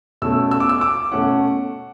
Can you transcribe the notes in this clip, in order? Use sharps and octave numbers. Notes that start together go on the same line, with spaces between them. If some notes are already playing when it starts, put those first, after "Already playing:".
B2 A3 C#4 E6
E6
D6
E6
D6
B2 A3 C#4 F#5